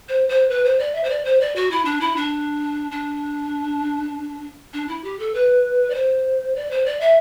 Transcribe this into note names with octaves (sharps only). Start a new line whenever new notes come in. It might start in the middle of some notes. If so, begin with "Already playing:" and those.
C5
C5
B4
C5
D5
E5
C5
D5
C5
D5
F#4
E4
D4
E4
D4
D4
D4
E4
G4
A4
B4
D5
C5
D5
C5
D5
E5